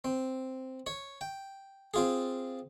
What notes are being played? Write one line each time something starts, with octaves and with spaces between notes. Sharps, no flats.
C4
C#5
G5
C4 F4 G#4